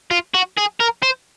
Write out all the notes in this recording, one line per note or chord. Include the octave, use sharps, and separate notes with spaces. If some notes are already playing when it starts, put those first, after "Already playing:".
F4
F#4
G#4
A#4
C5